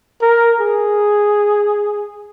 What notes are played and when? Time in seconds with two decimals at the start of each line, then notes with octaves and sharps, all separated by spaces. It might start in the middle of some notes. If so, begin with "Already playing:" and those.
0.22 A#4
0.60 G#4